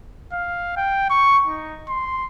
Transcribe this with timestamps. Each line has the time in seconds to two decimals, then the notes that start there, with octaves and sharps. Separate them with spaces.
0.33 F5
0.77 G5
1.10 C#6
1.47 D#4
1.89 C6